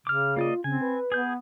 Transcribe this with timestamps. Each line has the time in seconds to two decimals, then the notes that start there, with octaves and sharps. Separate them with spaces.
0.07 C#3 D6 F6
0.36 A#3 F4 D5 D#5
0.64 C#3 C4 G#5
0.81 B4
1.12 B3 G#4 G6